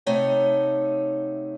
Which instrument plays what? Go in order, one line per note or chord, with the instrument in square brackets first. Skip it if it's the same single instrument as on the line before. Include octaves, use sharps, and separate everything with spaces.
[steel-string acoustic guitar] C3 A3 D#4 C#5 F#5